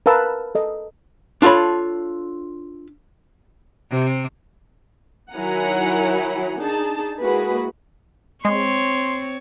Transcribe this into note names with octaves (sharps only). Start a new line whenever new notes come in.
A#4 B4 F5 A5 E6
A4 D#5
D4 F4 A4 C#5 B5
C3
D#3 F#3 E4 F#5 G#5 A#5
D4 D#4 G#4 A5
G#3 A#3 E4 F#4 G#4 B4
G#3 C4 C#5 C6